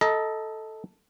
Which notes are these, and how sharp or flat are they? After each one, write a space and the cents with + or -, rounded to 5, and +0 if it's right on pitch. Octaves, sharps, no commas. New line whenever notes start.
A4 +0 D#5 +20 A#5 +25